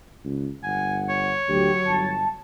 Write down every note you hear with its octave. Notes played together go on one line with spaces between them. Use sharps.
C#2
G1 F#5 G#5
C#5
D2 F#3 G4
G1 A5